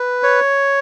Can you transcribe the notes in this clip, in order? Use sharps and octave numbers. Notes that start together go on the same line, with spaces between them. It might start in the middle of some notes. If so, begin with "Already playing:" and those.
Already playing: B4
C#5